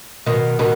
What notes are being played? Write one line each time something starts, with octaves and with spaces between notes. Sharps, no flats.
B2 D#3
B2 D#3